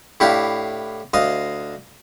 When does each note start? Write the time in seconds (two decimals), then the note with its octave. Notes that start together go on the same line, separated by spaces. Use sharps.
0.20 A2 D4 E4 G4 F5 C6
1.14 D2 D#5 F5 C6